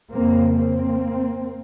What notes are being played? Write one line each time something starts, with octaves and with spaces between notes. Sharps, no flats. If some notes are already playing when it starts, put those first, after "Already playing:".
F2 C#3 A#3 C4
A#3 C4